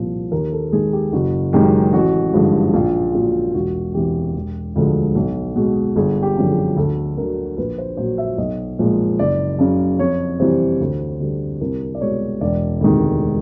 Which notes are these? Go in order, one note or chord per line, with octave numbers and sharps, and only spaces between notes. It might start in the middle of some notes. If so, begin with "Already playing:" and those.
Already playing: C2 A#2 F3
D#2 A#4
A4
D#3 G#3 G#4
G4
F#1 F#4
F#2 D#3 G#3 G4
A1 F#4
G2 D3 F3 G#3
A#1 F4
A#2 F#3 F4
E1 F#4
E2 C3 E3 G4
E1
D2 D3 F3 G#3
B1
B2 G#3
G1 G#4
G4
F#2 D3 F3
G#4
D2 A4
D3 F#3 A#4
A#1 B4
C5
A#2 F#3 C5
E5
B1 D#5
A#2 F3 G#3
F#1 D5
F#2 C#3
F2 C#5
C3 E3 G3 C5
D2
D3 G3
C2 A#4
D5
B2 G#3 C#5
E1 D5
D2 C3 D#3 G#3